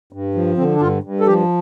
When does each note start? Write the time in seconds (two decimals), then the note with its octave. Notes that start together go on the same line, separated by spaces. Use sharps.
0.13 G2
0.35 F3
0.57 D3 C4
0.75 D4
0.81 G2 F4
1.03 G2
1.20 A4
1.27 F3 G4